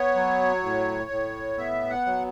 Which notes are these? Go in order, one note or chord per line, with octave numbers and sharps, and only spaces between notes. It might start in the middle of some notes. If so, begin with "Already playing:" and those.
Already playing: B3 C#5
F#3
A2
A2
B3 E5
F#5
F#3